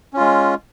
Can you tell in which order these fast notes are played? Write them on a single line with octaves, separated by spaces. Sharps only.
C#4 F4 G#3